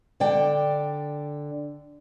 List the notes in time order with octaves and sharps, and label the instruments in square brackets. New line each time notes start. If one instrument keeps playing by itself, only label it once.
[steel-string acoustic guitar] D3 D5 G5